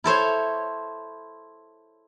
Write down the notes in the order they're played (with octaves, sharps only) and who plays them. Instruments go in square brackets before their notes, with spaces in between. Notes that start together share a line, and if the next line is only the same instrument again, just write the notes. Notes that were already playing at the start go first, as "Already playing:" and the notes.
[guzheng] E4 A4 C5 C#5